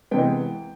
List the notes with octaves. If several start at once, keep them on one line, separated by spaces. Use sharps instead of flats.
C3 E3 G#3 B3 G5